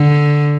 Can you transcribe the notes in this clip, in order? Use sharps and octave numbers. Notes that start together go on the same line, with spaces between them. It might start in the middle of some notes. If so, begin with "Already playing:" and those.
Already playing: D3